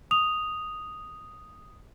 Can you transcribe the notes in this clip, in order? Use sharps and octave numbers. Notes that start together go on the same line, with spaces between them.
D#6 F7